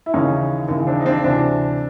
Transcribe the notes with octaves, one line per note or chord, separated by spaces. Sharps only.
E4
D#2 C#3 E3 C#4 D#4
D#2 C#3 E3
C4 D4
D#4
C4 D4
D2 C3 E3 C4 D4